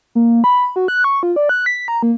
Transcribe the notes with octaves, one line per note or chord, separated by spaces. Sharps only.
A#3
B5
F#4
F#6
C#6
F4
D5
F#6
B6
A#5
A#3